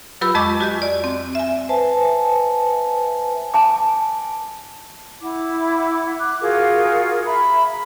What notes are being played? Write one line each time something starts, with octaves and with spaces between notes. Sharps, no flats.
F#3 F4 G4 B4 B5 E6
F2 G#3 D#5 C#6 D6 G6
F#4 G4 D#5
D5
C4
E5 G#5
B4 C5 E5 G#5 A5
G#5 A5 D6
E4 F#5 D6
D6 F#6
F4 F#4 G#4 A#4
E5 A#5 B5